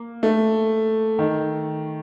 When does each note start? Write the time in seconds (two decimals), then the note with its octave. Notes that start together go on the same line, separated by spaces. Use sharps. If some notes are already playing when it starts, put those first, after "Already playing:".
Already playing: A#3
0.23 A3
1.19 D#3